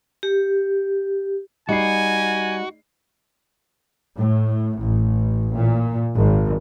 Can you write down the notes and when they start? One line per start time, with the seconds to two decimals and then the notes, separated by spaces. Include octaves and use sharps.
0.23 G4
1.69 G3 D#4 F#4 G#5 C7
4.18 A2
4.82 A1
5.57 A#2
6.16 G#1